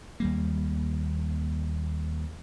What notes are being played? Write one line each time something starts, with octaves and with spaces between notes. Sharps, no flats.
D#2 G3 A#3